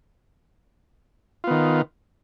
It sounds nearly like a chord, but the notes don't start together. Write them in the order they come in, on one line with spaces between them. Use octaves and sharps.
F4 B3 D#3